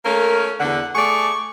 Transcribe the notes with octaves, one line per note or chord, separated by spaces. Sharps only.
A3 A#3 C#4 A#4
E2 D3 F#5
A3 G#4 D5 C#6